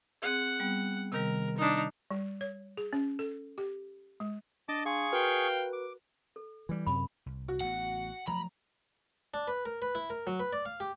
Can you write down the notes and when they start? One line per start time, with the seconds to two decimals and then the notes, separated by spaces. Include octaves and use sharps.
0.22 C4 G#4 F#5
0.60 G3 B3
1.12 C3 D#3 G3 A#4
1.57 D4 D#4
2.11 G3
2.41 C#5
2.77 G#4
2.93 C#4
3.19 A4
3.58 G4
4.20 G#3
4.69 D4 D#5 A5 D6
4.86 G#4 F5 C6 C#6 D#6
5.13 F#4 A#4 B4 F5 G5
5.73 D6
6.36 A4
6.69 E3 G3
6.87 F#2 C3 B5
7.26 C2
7.48 F#4
7.61 A1 B3 F#5
8.28 F3 F#3 A3 A#5 B5
9.34 D4
9.48 B4
9.65 A#4
9.82 B4
9.95 E4
10.10 A#4
10.27 F#3
10.40 B4
10.53 D5
10.65 F5
10.80 G4